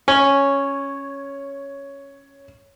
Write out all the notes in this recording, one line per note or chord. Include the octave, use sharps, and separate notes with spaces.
C#4 C#5